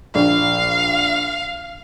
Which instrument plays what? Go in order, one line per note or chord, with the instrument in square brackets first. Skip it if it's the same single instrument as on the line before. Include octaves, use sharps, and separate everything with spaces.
[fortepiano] A#1 [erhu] F5